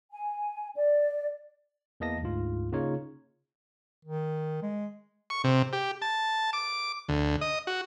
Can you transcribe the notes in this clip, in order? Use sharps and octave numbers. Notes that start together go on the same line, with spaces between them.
G#5
D5
E2 E3 A#3 D#5 A5 A#6
D2 G#2 F4
C#3 A#3 D#4 F4 C#5
D#3
G#3
C#6
C3
G4
A5
D6
D2
D#5
F#4